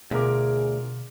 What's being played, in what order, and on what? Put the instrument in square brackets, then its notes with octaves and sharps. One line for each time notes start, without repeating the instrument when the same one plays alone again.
[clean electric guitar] D2 [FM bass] B2 [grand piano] F4 A#4 D6 [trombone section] G#4